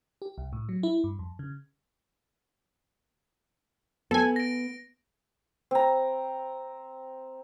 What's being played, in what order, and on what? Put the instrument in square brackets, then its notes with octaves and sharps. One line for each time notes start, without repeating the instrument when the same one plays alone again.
[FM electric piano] G4
C2
A2
F#3
E4
G2
F2
C#3
[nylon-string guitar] B3 [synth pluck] A4 G#5
[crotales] A#6 D7
[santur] C4 A#5